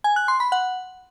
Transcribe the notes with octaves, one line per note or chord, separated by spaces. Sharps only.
G#5
F#6
C6
B5
F#5